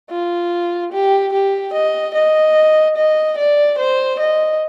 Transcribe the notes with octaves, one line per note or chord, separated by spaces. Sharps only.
F4
G4
G4
D#5
D#5
D#5
D5
C5
D#5